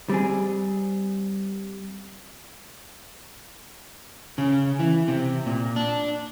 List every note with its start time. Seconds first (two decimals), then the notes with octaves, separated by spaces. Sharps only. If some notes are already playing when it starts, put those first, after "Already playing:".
0.10 G3 C4 G#4
4.38 C#3
4.79 E3
5.08 C3
5.46 A#2
5.76 D4